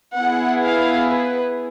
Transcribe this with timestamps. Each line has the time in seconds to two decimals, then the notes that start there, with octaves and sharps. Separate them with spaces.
0.16 B3 E4 G#4 F#5
0.63 F5
1.09 B4